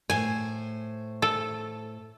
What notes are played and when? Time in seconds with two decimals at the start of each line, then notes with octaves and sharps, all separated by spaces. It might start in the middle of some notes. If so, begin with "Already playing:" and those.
0.10 A2 C5 G#5
1.22 A4